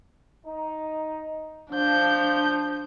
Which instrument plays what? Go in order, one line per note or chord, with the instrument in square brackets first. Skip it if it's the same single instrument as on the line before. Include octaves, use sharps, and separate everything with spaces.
[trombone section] D#4
[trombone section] F3 [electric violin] D4 G6